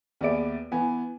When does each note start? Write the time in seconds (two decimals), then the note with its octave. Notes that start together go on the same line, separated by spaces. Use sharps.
0.21 D#2 B3 G#4 D5 E5 D7
0.71 E3 B3 G#5